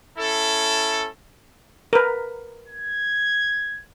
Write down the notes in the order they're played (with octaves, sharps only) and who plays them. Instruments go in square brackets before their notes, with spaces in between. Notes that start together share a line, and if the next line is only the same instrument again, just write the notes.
[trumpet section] C#4 E4 A4
[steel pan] A#4 B4
[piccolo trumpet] G#6